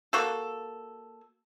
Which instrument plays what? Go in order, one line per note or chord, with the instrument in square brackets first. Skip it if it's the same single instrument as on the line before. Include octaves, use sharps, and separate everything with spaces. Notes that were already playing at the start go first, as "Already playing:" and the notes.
[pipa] A#3 F#4 A4